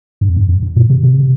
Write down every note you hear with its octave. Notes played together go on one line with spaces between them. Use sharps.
G2
F2
G2
F2
G2
A#2
C3
C3